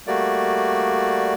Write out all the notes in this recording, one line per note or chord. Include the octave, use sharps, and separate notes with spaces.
G3 A3 A#3 F#4 D5